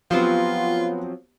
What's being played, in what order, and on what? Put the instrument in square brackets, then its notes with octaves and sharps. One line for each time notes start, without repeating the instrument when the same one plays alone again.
[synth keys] F3 F#3 C4 [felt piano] B3 G4 [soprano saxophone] F4